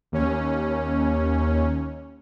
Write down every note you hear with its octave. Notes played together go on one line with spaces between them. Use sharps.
D#2 C#4